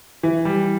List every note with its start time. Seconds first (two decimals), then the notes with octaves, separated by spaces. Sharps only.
0.23 E3
0.45 G3